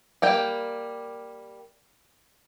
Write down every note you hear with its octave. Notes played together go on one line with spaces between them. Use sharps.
G3 A#3 G5